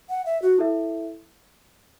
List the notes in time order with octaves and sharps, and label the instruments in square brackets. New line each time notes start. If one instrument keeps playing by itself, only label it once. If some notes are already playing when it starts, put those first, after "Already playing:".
[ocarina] F#5
E5
F#4
[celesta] E4 A4 E5